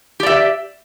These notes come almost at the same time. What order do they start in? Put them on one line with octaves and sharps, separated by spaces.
G4 D5 E5